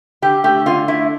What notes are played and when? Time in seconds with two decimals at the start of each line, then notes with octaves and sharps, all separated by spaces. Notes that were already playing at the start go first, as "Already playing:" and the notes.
0.22 D3 G4
0.44 A3 G4
0.66 D3 F4
0.88 A3 E4